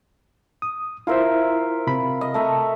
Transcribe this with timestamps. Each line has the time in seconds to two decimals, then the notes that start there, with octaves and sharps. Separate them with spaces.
0.62 D#6
1.07 E4 F4 A#4 C5 E5
1.87 C3 B5
2.21 D#5
2.34 A3 E5 A#5